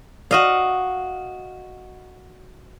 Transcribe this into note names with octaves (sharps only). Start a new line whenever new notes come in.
F#4 D#5 F5